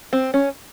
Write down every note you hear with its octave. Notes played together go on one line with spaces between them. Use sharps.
C4
C#4